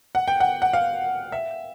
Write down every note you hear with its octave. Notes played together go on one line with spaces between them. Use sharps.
F#5
G5
F#5
F#5
F5
E5